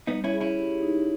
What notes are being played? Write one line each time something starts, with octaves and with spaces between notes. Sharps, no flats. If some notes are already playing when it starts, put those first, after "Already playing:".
G3 B3 D#4
C#4 E4
G#4
C#4 E4
G4
D#4